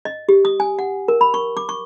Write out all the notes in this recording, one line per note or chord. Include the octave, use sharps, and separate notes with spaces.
D#5
G4
D#6
G#5
F#5
A#4
B5
C#6
D6
C#6